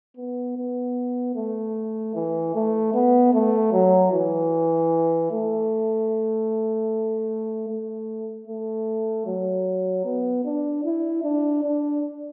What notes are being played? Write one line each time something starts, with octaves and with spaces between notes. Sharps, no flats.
B3
B3
A3
E3
A3
B3
A3
F#3
E3
A3
A3
A3
F#3
B3
D4
E4
D4
D4